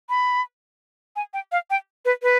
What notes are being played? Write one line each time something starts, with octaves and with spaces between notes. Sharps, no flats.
B5
G#5
G5
F5
G5
B4
B4